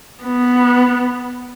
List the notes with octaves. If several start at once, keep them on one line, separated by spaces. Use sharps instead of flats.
B3